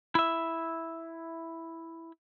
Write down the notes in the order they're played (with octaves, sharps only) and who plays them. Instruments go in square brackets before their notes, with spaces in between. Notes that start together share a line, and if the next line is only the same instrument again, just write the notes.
[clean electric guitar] E4 E5